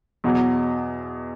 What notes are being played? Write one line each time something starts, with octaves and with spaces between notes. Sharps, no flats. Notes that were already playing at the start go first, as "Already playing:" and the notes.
E2 B2 F#3